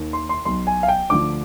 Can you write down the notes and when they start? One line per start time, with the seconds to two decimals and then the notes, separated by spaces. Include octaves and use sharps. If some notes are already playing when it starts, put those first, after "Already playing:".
Already playing: D#2 D#3
0.13 C6
0.29 C6
0.45 B1 B2 C6
0.67 G#5
0.83 F5
0.88 G5
1.10 D2 D3 F3 D6